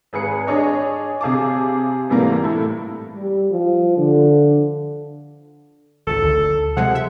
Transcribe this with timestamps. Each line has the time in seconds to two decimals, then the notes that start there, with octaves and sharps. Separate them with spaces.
0.13 G#1 G#4 B4 C#7
0.47 D4 G#4 C#5 D#5
1.21 C3 G#4 F5 A5 D6
2.09 G#2 C3 E3 G3 A3 A#3
2.44 A2 E4 A4
3.15 G3
3.51 F3
3.97 D3
6.07 G#1 C#2 A4
6.22 D2
6.77 C3 F3 G#3 F#5
6.95 E5